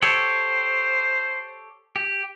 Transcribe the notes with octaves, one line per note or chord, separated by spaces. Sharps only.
G4 A4 C5 C#5
G4